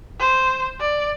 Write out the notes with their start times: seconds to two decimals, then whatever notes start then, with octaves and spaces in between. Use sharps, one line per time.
0.20 C5
0.80 D5